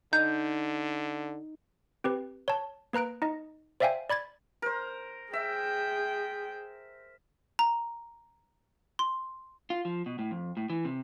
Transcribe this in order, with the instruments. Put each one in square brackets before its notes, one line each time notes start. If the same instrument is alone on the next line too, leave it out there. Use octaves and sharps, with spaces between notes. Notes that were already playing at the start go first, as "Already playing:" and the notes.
[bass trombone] D3 [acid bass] D#4 [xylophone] G6
[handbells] C4 G4 B4
C#5 A5
A#3 B4 A#5 F#6 D7
D#4 D#5
C5 D5 E5 F5 G5 G#5
D5 B5 G#6 A6
[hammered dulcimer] A#4 C5
[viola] G#4 G5 [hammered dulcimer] E5
[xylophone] A#5
C6
[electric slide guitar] F4
F3
B2
A2
F2
A2
E3
C3